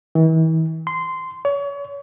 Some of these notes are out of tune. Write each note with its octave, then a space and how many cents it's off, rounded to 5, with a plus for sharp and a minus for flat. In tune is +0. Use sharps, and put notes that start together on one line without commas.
E3 -40
C6 -15
C#5 +35